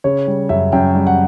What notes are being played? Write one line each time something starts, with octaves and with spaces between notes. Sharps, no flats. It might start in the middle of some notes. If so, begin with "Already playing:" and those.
C#3 C#5
G3
F#2 E5
F#2 G5
G3
F#5